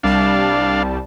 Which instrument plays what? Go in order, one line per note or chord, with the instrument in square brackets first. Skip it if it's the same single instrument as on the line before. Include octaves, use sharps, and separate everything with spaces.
[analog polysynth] C2 G3 A5 [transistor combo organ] D4 F5